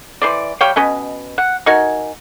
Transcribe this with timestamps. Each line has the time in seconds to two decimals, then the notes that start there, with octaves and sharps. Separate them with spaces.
0.22 E3 C5 D5
0.61 G3 C#5 F5 G5
0.76 B2 C#4 B4 D#5
1.38 F#5
1.66 D#4 F#4 A#4 G#5